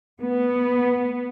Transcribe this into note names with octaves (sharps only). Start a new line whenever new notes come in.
B3